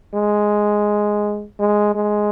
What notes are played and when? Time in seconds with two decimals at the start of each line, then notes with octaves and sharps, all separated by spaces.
0.14 G#3
1.59 G#3
1.95 G#3